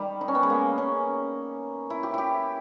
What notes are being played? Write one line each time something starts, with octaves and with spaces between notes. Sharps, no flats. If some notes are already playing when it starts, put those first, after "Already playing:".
Already playing: D#3 G3
D#4
C#4
B3
G#3
A#3
C#4
E4
G4
E4 G4